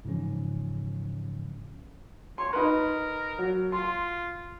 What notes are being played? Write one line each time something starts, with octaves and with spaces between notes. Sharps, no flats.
G#2 C#3 E3 F3 C#4
C#5 C6
D#4 A#4 B4
F#3
F4 C6